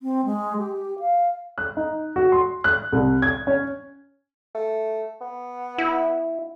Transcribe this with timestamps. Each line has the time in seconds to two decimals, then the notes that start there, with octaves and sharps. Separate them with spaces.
0.01 C4
0.25 G#3
0.58 G4
0.99 F5
1.58 F#6
1.77 D#4
2.16 F#4
2.32 C6
2.64 F#6
2.92 C2
3.22 G#6
3.47 C#4
4.55 A3
5.21 B3
5.78 E4